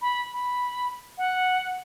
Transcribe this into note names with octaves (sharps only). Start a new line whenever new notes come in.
B5
B5
F#5